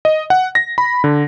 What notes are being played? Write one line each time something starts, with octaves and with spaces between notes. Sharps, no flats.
D#5
F#5
A#6
B5
D3